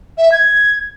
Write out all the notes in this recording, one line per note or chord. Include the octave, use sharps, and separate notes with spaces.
E5
G#6